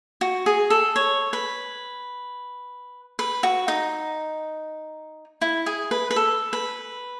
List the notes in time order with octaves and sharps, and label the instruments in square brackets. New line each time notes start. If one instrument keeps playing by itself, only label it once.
[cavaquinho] F#4
G#4
A4
C#5
B4
B4
F#4
D#4
E4
G#4
B4
B4
A4
B4